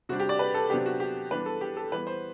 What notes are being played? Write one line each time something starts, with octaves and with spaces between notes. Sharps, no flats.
C3 G3 D4 F#4
G4
D5
B4
A4
C3 F#3 B3 D4 G4
F#4
G4
E3 G3 B3 D4 B4
A4
G4
A4
E3 G3 B3 B4
C5